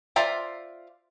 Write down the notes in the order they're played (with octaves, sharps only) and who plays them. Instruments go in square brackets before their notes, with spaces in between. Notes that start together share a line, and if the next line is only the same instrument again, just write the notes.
[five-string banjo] F4 C5 D5 E5